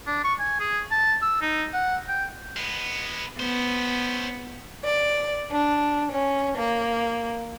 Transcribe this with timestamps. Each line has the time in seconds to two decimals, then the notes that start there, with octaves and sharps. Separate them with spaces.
0.07 D4
0.24 C#6
0.40 G#5
0.60 G#4
0.91 A5
1.22 E6
1.41 D#4
1.74 F#5
2.09 G5
2.57 G#3 B3
3.40 B3 C#4 C5
4.84 D5
5.52 D4
6.12 C#4
6.58 A#3